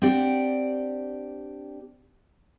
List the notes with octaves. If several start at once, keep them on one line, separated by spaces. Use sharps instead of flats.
C4 D4 G4 D5 F#5